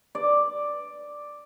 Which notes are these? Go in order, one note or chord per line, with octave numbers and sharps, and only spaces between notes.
D5